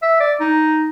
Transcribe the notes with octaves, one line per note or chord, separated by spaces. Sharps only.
E5
D5
D#4